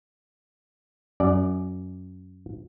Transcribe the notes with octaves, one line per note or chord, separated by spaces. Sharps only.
F#2 D5